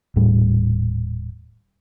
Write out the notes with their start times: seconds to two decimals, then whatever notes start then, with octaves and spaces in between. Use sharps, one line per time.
0.16 D#1 A2 G3